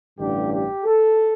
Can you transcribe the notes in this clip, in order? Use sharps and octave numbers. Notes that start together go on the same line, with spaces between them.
A1 G2 D3 G4
G4
A4